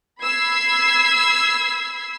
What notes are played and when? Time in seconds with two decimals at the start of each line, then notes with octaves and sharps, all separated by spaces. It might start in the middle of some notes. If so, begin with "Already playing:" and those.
0.23 B5 E6 G#6 C7